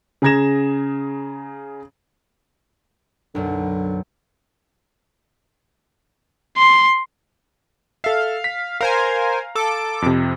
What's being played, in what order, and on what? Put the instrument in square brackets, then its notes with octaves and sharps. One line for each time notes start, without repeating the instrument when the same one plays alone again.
[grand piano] C#3 G#4 A#5 G#6 A#6 E7
[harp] B1 F#2 [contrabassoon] D3
[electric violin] C6
[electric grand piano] A4 E5 [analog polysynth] F5
[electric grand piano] B6
[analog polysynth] A#4 C5 G#5 [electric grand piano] F5 A#5
[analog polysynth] A4 D6
[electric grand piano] F2 C3